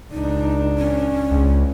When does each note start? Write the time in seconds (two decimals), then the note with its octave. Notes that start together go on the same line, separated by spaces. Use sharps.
0.12 C#2 D4 D#4
0.78 C#4
1.31 C#2